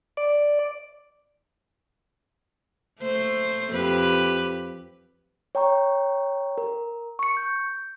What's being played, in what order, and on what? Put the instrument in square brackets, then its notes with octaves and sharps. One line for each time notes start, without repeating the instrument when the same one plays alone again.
[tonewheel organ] D5
[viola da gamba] A3 C5
F2 G4 B4
[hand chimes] C#5 G5 A#5 C#6
A#4
C#6 C#7
G6